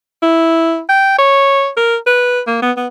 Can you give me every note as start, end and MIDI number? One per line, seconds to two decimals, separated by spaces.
0.22 0.81 64
0.89 1.15 79
1.18 1.69 73
1.77 1.96 70
2.06 2.41 71
2.47 2.58 58
2.62 2.71 59
2.77 2.87 59